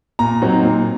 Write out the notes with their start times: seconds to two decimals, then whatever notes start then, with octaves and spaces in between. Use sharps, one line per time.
0.19 A#2 A#5
0.42 F#3 C4 D#4
0.63 A#2